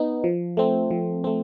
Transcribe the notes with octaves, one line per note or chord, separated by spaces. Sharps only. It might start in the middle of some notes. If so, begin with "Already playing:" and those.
Already playing: B3 D#4
F3
A3 C4
F3
A3 C4